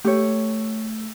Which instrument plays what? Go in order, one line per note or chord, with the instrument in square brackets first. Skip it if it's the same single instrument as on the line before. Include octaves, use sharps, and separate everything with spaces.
[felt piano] A3 [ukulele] G4 C#5